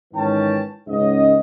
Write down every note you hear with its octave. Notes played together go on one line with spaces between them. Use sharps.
G#2 D#3 E3 C#4 G5 A5
C#2 G#2 C#4 D#5